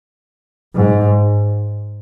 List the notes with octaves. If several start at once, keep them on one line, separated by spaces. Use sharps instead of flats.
G#2